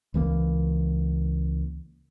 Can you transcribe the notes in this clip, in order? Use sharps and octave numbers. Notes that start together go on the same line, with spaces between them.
C#2 E3 F3 A#3